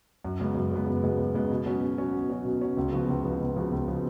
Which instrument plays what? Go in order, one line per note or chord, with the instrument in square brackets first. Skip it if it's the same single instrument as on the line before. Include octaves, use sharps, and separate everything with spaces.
[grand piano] F#2
C#3 G#3 B3
F#2
C#3 G#3 B3
F#2
C#3 G#3 B3
F#2
C#3 G#3 B3
B2
F#3 C#4
B2
F#3 C#4
B2
F#3 C#4
B2
F#3 C#4
C#2
C#3 F3 B3 F#4
C#2
C#3 F3 B3 F#4
C#2
C#3 F3 B3 F#4
C#2
C#3 F3 B3 F#4